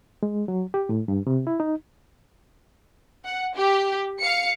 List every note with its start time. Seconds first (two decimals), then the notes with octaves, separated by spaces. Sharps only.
0.23 G#3
0.48 F#3
0.74 G4
0.89 A2
1.08 G2
1.27 C3
1.47 E4
1.60 D#4
3.24 F#5
3.55 G4
4.21 F5 C#7